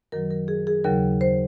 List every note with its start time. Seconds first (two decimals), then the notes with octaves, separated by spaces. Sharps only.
0.12 F#2 D#3 F#3 A#4
0.31 A#4
0.48 G#4
0.67 G#4
0.84 D#2 C#3 F#3 A#4
1.21 C5